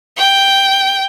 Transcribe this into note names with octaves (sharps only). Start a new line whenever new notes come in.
G5